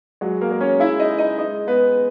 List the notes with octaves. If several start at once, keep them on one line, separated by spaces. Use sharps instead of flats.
F#3 G#3 F#4
A#3 A#4
G#3
C#4 C#5
G#3 E4 E5
D#4 D#5
G#3
D#4 D#5
G#3 D#4 D#5
G#3 B3 B4